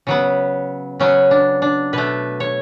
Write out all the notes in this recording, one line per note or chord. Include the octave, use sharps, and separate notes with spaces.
C#3 F#3 B3
C#3 F#3 B3 C#4
D4
D4
B2 A3 B4
C#5